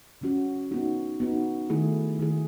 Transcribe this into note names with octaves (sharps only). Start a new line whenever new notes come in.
C#3 F#3 C#4 F#4
B3 D#4 F#4
B3 D#4 F#4
D#3 A3 E4 G#4
D#3 A3 E4 G#4